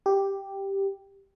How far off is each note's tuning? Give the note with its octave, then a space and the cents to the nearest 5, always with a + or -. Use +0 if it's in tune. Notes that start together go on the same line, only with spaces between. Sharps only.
G4 +0